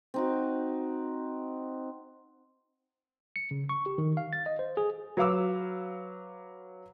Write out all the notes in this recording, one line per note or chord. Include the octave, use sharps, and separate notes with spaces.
C4 D#4 F#4
C#7
C#3
C#6
G4
D#3
F5
A6
D#5
C5
G#4
F#3 B4 F5 D6 E6